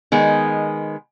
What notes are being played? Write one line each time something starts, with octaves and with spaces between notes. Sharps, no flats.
D#3 G#3 B3